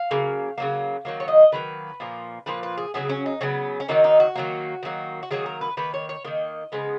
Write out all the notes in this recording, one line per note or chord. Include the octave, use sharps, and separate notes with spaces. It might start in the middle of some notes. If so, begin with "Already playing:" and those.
Already playing: F5
C#3 F#3 A#3
C#3 F#3 A#3
D#3 F#3 A#3
C#5
D#5
D#3 F#3 A#3 B4
A#2 F3 A#3
A#2 F3 A#3 B4
B4
G#4
C#3 F#3 B3 G#4
C#4
D#4
C#3 F#3 B3 C#4
C#4
D#3 F#3 A#3 D#4
D#4
F#4
D#3 F#3 A#3
D#3 F#3 A#3
F#4
D#3 F#3 A#3 G#4
A#4
B4
D#3 A#3 B4
C#5
C#5
D#3 A#3 D#5
C#3 F3 G#3 B3